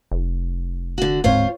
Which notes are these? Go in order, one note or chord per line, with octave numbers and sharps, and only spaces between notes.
F1
D3 F#4
D1 G#2 C4 F4 C5 C#5